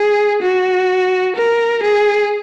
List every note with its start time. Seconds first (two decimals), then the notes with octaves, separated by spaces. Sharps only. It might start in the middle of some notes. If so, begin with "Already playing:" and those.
Already playing: G#4
0.42 F#4
1.36 A#4
1.83 G#4